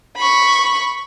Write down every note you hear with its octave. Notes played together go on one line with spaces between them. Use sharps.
B5 C#6